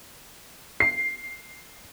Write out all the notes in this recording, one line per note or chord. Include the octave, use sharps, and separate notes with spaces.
C7